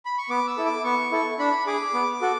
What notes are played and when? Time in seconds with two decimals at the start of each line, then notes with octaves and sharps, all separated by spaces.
0.05 B5
0.18 C#6
0.30 B3 D6
0.48 E6
0.57 E4 A4
0.66 D6
0.84 B3 C#6
1.12 E4 A4
1.39 D4 B5
1.67 G#4 D6
1.94 B3
2.21 F#4 A4